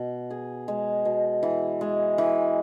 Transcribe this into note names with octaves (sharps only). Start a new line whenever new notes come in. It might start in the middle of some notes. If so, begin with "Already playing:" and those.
Already playing: B2
G#4
G#3
B2
E3
G#3
E3